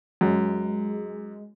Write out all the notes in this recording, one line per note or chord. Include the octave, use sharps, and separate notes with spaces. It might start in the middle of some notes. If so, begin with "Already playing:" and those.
F#2 G#3